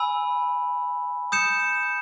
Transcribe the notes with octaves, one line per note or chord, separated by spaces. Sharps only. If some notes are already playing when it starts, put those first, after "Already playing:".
Already playing: G#5 B5 E6
D#6 G6 C#7 E7